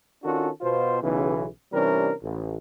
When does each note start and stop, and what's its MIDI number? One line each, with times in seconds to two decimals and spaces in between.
0.23 0.48 51
0.23 0.48 61
0.23 0.48 62
0.23 0.48 65
0.23 0.48 66
0.23 0.48 69
0.61 0.98 47
0.61 0.98 65
0.61 0.98 72
1.02 1.46 35
1.02 1.46 49
1.02 1.46 52
1.72 2.12 48
1.72 2.12 52
1.72 2.12 55
1.72 2.12 61
1.72 2.12 62
1.72 2.12 70
2.22 2.55 33